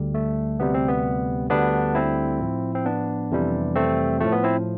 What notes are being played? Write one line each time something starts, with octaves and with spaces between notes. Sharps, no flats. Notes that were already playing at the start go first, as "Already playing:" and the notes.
Already playing: D2 D3 G3
A3
D2 C3 G3 B3
C4
B3
D2 D3 G3 B3 D4
C4 E4
A2 F3
C4
B3 D4
F2 C3 E3 G3
A3 C4
A2 F3 A3
B3
C4 E4